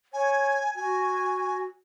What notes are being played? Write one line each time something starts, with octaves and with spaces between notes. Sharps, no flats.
C#5 G#5
F#4 G#5